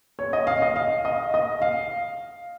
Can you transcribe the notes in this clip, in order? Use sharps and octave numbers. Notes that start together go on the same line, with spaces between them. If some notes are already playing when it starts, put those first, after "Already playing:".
C#5
D#5
F5
D#5
F5
D#5
D#5
F5